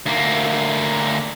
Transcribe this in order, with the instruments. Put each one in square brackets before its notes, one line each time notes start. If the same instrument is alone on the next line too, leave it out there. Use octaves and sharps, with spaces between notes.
[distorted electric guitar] D2 A#3